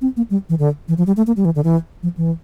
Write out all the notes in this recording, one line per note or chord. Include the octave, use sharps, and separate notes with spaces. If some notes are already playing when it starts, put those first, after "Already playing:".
C4
A#3
G3
E3
D3
E3
F3
G3
A3
A#3
G3
E3
D3
E3
F3
E3